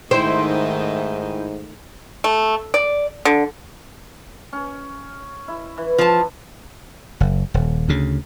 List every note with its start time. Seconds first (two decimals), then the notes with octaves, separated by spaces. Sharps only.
0.11 G#2 D#3 A3 D#4 E4 C5 G5
2.24 A3
2.74 D5
3.25 D3
4.53 C#4
5.48 E4
5.78 E3
5.98 F3 A5
7.20 F#1
7.54 D#1
7.89 D2 C#3